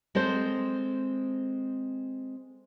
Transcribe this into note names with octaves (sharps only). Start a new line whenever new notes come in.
G#3 C4 A4 C5